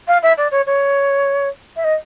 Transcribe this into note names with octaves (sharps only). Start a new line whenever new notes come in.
F5
E5
D5
C#5
C#5
E5
D#5